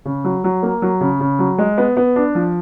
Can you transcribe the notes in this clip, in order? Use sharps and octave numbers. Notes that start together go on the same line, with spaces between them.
C#3
F#3
F#3
A#3
F#3
C#3
C#3
F#3
G#3
B3
B3
D4
F3